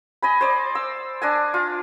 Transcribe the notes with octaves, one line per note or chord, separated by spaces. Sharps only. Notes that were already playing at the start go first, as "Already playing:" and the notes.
D#5 G#5 B5
C5 D5 D#5
E6
D4 D#5 G#5
F4